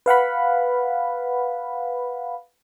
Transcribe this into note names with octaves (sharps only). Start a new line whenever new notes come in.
B4 F5 F#5 B5